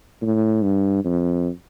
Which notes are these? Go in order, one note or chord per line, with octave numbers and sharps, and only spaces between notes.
A2
G2
F2